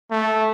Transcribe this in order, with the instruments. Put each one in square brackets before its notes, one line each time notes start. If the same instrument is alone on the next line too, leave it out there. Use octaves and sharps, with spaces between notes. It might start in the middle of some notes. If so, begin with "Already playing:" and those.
[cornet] A3